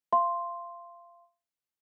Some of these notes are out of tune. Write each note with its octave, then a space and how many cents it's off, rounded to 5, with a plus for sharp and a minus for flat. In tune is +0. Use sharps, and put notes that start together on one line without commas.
F5 -25 C6 +0